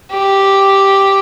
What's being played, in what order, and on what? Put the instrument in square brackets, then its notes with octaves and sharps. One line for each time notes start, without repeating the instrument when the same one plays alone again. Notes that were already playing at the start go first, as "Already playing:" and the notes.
[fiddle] G4